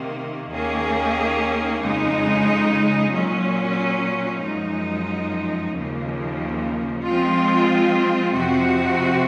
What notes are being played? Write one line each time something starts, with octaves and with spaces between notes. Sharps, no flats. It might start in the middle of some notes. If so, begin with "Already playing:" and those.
Already playing: C3 D#3 A#3
D#2 D#3 A#3 C#4 G#4
F2 C#3 G#3 D#4
A#2 F#3 C#4
F#2 F3 G#3 D#4
D#2 C#3 F3 A#3
F3 G#3 C4 F4
F2 C3 F3 C4 F#4